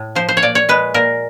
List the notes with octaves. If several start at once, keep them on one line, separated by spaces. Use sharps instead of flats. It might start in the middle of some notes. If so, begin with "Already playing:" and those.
Already playing: A2
F3 C5
C5
C#5
A#2 D5
C#5
G#3 B4
A#2 A#4